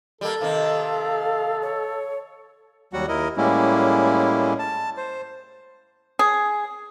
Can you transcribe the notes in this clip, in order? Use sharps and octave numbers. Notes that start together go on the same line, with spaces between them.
G3 A#3 A4
C3 D#3 A#3 F5
C#5
D#2 F#3 G3 F#4 F#5
D#2 E4 A#4 D#5
A2 G3 G#3 A#3 C#4 E4
A5
C5
G#4